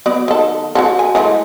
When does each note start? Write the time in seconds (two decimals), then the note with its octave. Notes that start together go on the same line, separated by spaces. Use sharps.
0.06 F#3 B3 D5
0.28 D#3 A4
0.75 F#4 G#4 A4
0.99 G#5
1.15 E3 G#3 A3